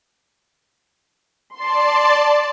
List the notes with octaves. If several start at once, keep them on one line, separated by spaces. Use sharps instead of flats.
D5 A5 C6